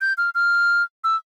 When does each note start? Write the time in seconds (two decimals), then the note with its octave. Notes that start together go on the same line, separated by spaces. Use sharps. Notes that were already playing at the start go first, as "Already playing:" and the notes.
0.01 G6
0.18 F6
0.35 F6
1.04 E6